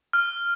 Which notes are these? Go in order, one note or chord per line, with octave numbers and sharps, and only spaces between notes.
F6